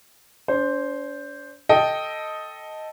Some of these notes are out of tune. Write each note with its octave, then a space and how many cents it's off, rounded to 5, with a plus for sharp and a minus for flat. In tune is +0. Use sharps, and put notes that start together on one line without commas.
D4 -45 C5 +0
A4 +0 D#5 +5 G5 +0